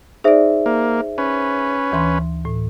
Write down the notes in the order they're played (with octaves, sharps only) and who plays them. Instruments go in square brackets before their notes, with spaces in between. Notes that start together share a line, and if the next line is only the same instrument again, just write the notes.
[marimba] D#4 D5 [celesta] G#4 C5 E5
[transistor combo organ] A#3
C#4 B4
[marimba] D2 E3 C6
A2